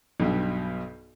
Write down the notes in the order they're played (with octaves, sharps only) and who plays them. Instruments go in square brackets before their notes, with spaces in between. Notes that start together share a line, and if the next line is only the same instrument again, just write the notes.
[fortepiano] B1 G2 B2